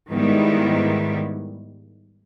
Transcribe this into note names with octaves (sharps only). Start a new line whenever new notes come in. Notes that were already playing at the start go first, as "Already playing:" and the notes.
G#2 D#3 G3 B3 E4